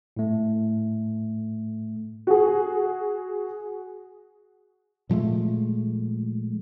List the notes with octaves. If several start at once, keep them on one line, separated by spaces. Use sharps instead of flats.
A2 A3
F#4 G#4
A#2 F3 G#3 A3